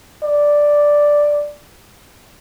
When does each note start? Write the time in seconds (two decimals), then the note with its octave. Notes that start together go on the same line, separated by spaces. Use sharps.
0.23 D5